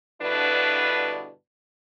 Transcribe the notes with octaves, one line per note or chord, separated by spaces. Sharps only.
G2 B2 D3 D4 E4 B4